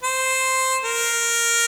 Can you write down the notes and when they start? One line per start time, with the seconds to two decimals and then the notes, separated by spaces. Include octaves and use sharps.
0.03 C5
0.83 A#4